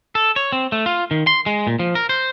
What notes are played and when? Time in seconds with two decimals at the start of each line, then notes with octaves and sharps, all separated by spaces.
0.15 A4
0.36 C#5
0.53 C4
0.72 A3
0.86 F4
1.11 D#3
1.27 C6
1.46 G#3
1.67 A#2
1.79 F3
1.95 A#4
2.09 C5